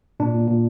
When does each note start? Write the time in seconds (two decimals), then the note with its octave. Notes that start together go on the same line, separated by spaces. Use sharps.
0.20 A#2 D4
0.34 A#2
0.48 A#2